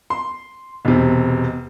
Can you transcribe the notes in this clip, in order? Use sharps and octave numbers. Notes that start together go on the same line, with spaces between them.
C6
E1 C3